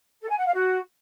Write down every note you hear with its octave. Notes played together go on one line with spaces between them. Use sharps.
A4
G#5
F#5
F5
F#4